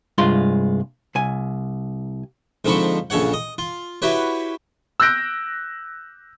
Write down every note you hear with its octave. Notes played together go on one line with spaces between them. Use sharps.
C2 G2 G#3 F4 C6
C2 G#5
G#2 D3 F3 C4 B5 C#6
A#1 C#3 A4 C#5 F#5
D#5
F4
E4 F#4 G4 B4 C#5
E6 F#6 G6 A#6 D7